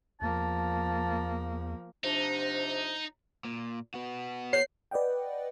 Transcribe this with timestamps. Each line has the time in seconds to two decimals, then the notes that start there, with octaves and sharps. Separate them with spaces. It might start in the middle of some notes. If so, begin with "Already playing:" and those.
0.22 E2 F3 A#3 A5
2.04 C3 F3 D4 D#4
3.45 A#2
3.94 B3 F#4
4.53 C#5 C7
4.91 B4 D5 D#5 F#5 G5